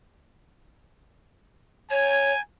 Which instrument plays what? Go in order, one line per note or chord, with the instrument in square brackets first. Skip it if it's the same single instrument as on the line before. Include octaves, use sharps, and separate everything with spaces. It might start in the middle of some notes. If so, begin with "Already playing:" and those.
[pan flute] C#5 [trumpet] G#5